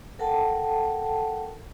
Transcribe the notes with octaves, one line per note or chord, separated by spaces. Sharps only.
A4 A#4 F#5 G5 A5